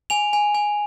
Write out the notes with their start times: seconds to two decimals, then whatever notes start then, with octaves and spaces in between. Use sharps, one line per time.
0.10 G#5 F7
0.33 G#5
0.55 G#5